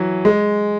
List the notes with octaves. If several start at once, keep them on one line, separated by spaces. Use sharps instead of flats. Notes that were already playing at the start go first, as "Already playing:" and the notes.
Already playing: E3 F#3
G#3